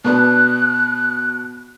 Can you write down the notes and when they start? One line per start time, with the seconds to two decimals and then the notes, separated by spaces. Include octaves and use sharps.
0.04 B2 B3 D4 F#6